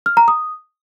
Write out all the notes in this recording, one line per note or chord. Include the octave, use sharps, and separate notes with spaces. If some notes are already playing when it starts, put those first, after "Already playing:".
F6
A#5
D#6